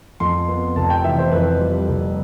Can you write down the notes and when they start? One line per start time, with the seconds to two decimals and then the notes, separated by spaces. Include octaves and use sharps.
0.20 F2 C6
0.48 B3
0.76 F1 A5
0.90 G5
1.04 E3 E5
1.18 C5
1.32 F2 B4
1.60 G3
1.88 F1